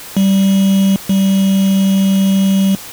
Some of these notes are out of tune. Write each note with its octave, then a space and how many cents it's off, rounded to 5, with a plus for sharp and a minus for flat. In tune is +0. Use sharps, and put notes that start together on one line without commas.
G3 -15
G3 -20